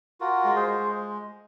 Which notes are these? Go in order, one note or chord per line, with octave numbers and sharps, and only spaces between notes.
F4 F#4 A#4
G#3
G#4 C5
G#3